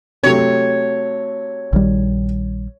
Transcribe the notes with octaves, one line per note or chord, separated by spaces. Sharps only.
C3 F#3 A3 C#5
A#1 D#3 G3